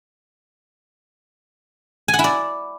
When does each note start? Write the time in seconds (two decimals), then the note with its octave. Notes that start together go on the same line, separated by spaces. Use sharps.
2.08 G#5
2.14 F#5
2.19 E4
2.24 D5